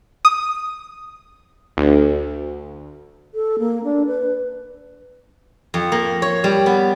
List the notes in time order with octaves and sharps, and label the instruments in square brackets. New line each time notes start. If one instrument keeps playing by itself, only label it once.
[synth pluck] D#6
[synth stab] D2
[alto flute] A4
A#3
D4
B4
[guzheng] F2
A#3
C#5
G3
B3